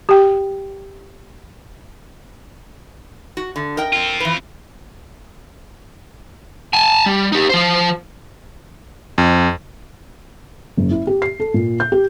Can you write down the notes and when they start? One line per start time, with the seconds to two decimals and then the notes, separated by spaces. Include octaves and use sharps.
0.09 G4 G5
3.37 F#4
3.56 D3
3.77 A#4 D#5 G5
3.93 C4 F4
4.20 E3 B4
6.73 G#5 A5
7.06 G3
7.32 D#4 G4
7.49 F3 C5
9.18 F2
10.77 F#1
10.91 E4
11.07 G4
11.22 C7
11.40 A4
11.54 A#2
11.80 G6
11.92 G4